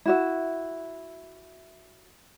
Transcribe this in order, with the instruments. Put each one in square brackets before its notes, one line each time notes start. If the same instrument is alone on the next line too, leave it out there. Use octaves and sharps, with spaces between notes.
[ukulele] E4 F#4 E5